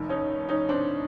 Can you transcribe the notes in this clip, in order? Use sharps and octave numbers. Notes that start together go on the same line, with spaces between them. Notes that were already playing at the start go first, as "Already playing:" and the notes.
Already playing: F1 D#2 D#3
C#4 D#4
C#4 D#4
C4 D4